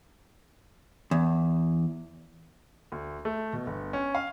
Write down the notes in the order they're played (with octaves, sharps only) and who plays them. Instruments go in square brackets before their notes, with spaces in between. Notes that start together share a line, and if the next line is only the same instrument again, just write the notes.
[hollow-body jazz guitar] E2
[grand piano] D2
A3
B2
G1
C#4
F5